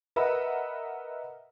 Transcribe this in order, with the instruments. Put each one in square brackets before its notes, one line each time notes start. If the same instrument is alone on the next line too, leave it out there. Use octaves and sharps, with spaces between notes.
[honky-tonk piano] A#4 B4 D#5 E5 F#5 B5